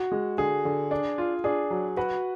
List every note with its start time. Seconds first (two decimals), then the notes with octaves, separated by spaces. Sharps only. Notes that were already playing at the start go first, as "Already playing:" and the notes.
Already playing: F#4
0.12 G#3
0.38 D3 G#4
0.65 D3
0.91 D4
1.18 F4
1.44 D4 G#4
1.71 F#3
1.97 F#4 B4